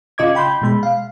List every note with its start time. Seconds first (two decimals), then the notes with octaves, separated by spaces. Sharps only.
0.18 C#3 F4 D#5 D6 G#6
0.35 G5 B5 C6 G6
0.62 B2 G#3 B5
0.83 F5